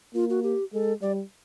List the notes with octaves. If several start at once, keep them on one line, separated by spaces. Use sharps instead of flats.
A#3 F4
F#4
G4
G#3 A4
G3 D5